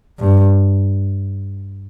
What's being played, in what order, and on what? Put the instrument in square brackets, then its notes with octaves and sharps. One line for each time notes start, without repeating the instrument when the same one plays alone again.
[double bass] G2